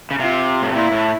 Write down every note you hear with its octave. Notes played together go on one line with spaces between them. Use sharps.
C#3
C3 F4
A2
A#2 E4
A2